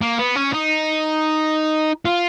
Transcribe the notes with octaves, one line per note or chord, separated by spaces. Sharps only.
A#3
B3
C#4
D#4
F4